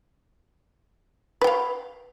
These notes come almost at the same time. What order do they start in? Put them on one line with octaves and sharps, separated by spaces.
B4 G5 F5